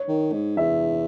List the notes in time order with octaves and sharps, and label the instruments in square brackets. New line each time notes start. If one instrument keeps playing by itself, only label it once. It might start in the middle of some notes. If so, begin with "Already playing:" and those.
Already playing: [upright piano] C#5
[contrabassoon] D#3
G#2
[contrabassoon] E2 [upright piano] E5